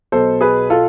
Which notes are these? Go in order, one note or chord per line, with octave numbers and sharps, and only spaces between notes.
B1 B2 A4 C5
G#4 B4
F4 A4